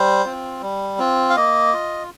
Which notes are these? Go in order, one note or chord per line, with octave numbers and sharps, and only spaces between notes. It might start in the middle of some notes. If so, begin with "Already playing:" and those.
Already playing: G3 C5
C4 F4
G3
C4 F4
F5
A#3 D#5
F4